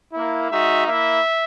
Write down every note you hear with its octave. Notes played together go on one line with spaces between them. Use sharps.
A#3 E4
G#3 D#4 F#4 E5
A#3 E4 E5